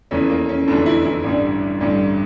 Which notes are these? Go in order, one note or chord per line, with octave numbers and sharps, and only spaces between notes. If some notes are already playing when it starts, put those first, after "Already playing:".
F1 E2 E3 C#4
A#3
C#4
F1 E2 D3 E3 D4
E3 E4
E3 E4
A1 G2 D3 G3
A1 G2 D3 G3